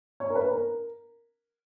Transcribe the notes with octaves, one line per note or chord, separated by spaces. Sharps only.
C#5
A#4
B4
A#4